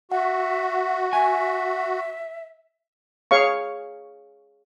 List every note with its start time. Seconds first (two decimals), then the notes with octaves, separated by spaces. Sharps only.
0.12 F#4 E5 F#5
1.13 E5 G#5
3.31 G#4 C#5 F5 C#6